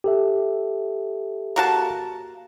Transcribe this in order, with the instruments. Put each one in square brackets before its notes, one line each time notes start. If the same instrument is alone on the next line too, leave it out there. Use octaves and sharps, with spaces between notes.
[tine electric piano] G4 A4 E5
[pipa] A#3 F#4 A5